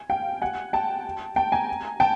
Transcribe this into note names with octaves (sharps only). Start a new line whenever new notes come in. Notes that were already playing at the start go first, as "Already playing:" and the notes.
Already playing: G#5
F5 G5
F#5 G#5
G5 A5
G5 A5
G#5 A#5
G5 A5